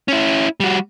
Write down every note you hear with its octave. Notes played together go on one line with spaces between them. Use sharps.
C#4 E4
G3 F#4